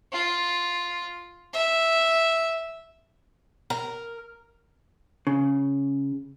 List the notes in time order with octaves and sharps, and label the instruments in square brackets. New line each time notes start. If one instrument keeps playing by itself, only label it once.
[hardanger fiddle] F4
E5
[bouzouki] A#4
[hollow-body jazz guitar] C#3